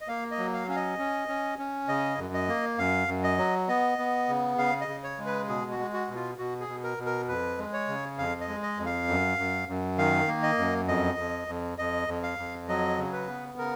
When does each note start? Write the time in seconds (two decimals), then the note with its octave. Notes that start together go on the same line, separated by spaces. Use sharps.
0.01 D#5
0.08 A#3 F5
0.31 D#5
0.38 F#3
0.53 F5
0.68 C#4 F5
0.76 D#5
0.99 C#4
1.28 C#4
1.58 C#4
1.88 C#3 D#5
2.18 F#2
2.34 D#5
2.48 A#3
2.78 F#2 F5
3.08 F#2
3.23 D#5
3.38 F#3
3.68 B3 D#5
3.98 B3
4.29 C#3
4.58 C#3 F5
4.81 D#5
4.88 C#3
5.04 C#5
5.19 G#3
5.26 B4
5.48 B2 G#4
5.71 F#4
5.79 G#3
5.94 F#4
6.08 B2
6.15 F4
6.38 B2 F#4
6.60 G#4
6.68 B2
6.83 A#4
6.98 B2
7.06 A#4
7.28 F2 B4
7.58 G#3
7.73 C#5
7.88 C#3
8.18 F2 F5
8.41 D#5
8.48 G#3
8.63 D#5
8.78 F2
8.86 F5
9.08 F#2
9.38 F#2
9.68 F#2
9.98 D#3 F5
10.28 A#3
10.43 D#5
10.58 F#2
10.88 F2 D#5
11.18 F2
11.48 F2
11.78 F2 D#5
12.08 F2
12.23 F5
12.38 F2
12.68 F#3 D#5
12.98 C#3
13.13 B4
13.28 B3
13.58 C#3 A#4